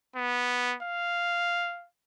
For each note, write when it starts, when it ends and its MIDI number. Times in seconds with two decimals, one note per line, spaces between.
0.16 0.76 59
0.83 1.87 77